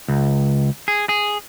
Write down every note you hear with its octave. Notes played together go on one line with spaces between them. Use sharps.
C#2
G#4
G#4